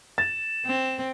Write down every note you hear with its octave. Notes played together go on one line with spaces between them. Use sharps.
A6 E7
C4